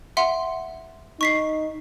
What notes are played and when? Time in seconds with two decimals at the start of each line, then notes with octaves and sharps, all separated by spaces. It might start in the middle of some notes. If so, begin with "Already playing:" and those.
0.17 E5 F#5 C6
1.21 D#4 C#6 B6 C7